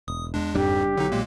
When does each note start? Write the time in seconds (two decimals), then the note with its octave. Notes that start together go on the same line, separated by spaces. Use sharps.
0.08 E1 D#6
0.34 E2 G#3 D4
0.54 F#1 F2 G#2 G3 D4 G4
0.97 B1 D3 F#3 D#4
1.12 A#2 G#3 A#3